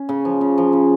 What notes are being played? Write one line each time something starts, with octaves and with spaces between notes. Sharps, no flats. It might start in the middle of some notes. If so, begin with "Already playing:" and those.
Already playing: C#4
C#3
F3
C#3
F3
C#3